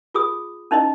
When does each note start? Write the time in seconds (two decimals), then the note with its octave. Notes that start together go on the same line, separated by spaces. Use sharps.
0.14 F4 G#4 D#6
0.71 C#4 D#4 E4 D#5